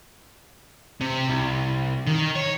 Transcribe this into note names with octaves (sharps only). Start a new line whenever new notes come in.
C3
C2
D#3
C#5